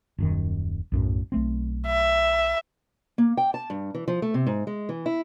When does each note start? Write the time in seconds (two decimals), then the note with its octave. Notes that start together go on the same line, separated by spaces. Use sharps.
0.18 D#1 F#2 D#3
0.92 B1 F#2 A2
1.32 B1 A3 C4
1.86 E5
3.18 A#3
3.37 G5
3.54 A5
3.70 G2
3.95 E3
4.08 F3
4.22 A3
4.34 C3
4.47 G#2
4.67 G#3
4.89 E3
5.06 E4